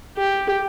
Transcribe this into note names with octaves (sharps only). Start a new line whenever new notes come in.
G4